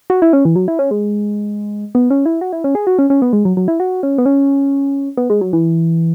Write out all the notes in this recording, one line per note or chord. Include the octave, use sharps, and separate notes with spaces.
F#4
E4
C#4
E3
F#3
E4
C#4
G#3
B3
C#4
E4
F#4
E4
C#4
G#4
F#4
C#4
C#4
B3
G#3
F#3
F#3
E4
F#4
C#4
B3
C#4
B3
G#3
F#3
E3